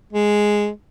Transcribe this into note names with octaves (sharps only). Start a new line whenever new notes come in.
G#3